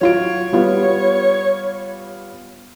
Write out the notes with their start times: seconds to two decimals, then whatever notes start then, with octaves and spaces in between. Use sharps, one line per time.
0.01 F#3 F4 C#5 D7
0.53 G3 B3 F4